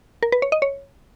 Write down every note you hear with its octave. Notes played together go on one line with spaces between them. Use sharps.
A#4
B4
C#5
D#5
C#5